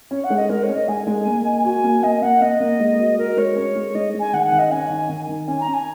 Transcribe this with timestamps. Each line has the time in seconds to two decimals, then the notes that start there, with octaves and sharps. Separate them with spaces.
0.11 C#4 C#5
0.24 F#5
0.30 G#3
0.36 D#5
0.49 G#3 A#4
0.63 C#5
0.69 C#4
0.75 D#5
0.88 G#3 G#5
1.07 G#3
1.27 A#3
1.45 D#5
1.64 F#4 G#5
1.84 A#3
2.03 A#3 D#5
2.22 A#3 F#5
2.41 A#3 D#5
2.60 A#3
2.80 G#3
2.99 F#4
3.18 F#4 A#4
3.37 G#3 C#5
3.56 C#4
3.76 G#3
3.95 G#3 D#5
4.14 G#3
4.19 G#5
4.33 D#3 F#5
4.46 F#5
4.52 D#3
4.58 D#5
4.71 C#4 G#5
4.90 D#3
5.09 D#3
5.29 D#3
5.48 C#4 G#5
5.60 A#5
5.67 C#4
5.73 G#5